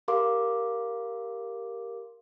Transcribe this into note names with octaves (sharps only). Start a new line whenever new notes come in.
G4 A#4 F5 C6 D6